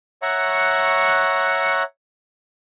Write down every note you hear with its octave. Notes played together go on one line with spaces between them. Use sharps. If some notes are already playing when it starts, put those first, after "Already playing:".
C#5 E5 F#5 A#5 C#6 F#6